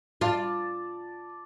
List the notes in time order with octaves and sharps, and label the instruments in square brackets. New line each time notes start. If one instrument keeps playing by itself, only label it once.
[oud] F4 [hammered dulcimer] D5 A5